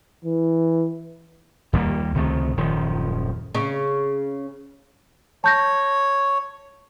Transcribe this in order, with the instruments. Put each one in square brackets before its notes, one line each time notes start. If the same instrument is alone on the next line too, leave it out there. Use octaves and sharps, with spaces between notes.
[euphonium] E3
[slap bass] D#2 G3 G#3 A#3
C#2 C3 D#3 A3
D#1 F#2 D#3 F3
[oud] C#3
[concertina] C#5 [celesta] A5 G6 A#6